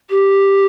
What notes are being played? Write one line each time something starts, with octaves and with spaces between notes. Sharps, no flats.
G4